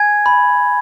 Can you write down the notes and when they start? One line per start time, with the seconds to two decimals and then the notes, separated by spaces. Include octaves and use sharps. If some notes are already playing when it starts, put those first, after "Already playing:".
Already playing: G#5 G#6
0.26 B5